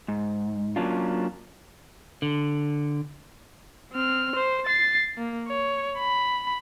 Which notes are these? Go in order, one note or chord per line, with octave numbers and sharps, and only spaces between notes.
G#2
F#3 A#3 C#4 D4 F4
D3
C4 F6
C5
A6 C7
A#3
C#5
B5